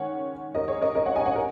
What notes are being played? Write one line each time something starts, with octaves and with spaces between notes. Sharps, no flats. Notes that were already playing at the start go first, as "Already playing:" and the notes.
Already playing: D#3 G#3 C#4 C#5 F#5
A#4 D#5
G#4 C#5
A#4 D#5
A#4 D#5
C#5 F#5
D#5 G#5
C#5 F#5
A#4